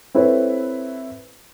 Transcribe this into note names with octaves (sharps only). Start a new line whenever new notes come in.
C4 E4 A4 B4 C#5